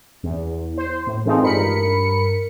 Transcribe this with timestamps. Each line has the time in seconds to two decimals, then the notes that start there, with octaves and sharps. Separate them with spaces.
0.23 E2
0.78 C5
1.07 A2
1.25 E3 F3 G#3 A3 C4 D#4
1.43 G2 A#4 B5 C#7